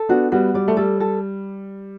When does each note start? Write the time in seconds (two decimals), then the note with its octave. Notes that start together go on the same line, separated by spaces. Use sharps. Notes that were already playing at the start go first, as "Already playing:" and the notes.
Already playing: A4
0.09 B3 D4 F#4
0.32 G3 B3 F#4
0.54 G3 D5
0.68 A3
0.77 G3 A4
1.00 A4